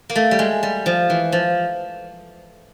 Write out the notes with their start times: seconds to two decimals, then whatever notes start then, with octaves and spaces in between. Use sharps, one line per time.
0.10 A#3
0.15 A3
0.31 G3
0.39 G#3
0.63 G3
0.86 F3
1.10 E3
1.32 F3